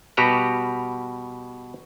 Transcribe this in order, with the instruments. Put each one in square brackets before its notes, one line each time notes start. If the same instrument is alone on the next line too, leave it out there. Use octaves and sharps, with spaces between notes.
[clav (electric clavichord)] B2 G3 F#4 G4 B4 A#5